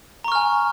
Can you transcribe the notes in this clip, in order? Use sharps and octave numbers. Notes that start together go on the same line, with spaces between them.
G#5 A#5 C#6 F6